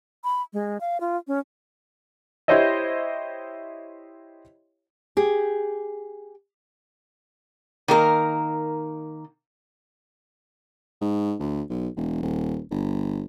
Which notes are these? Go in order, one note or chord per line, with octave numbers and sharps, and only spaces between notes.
B5
G#3
F5
F4
C#4
E4 G4 C5 C#5 D#5 E5
G4 G#4
D#3 A#3 A#4
G#2
D2
B1
E1
D#1
G1